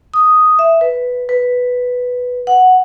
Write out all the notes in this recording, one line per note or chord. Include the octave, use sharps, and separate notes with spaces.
D#6
E5
B4
B4
F#5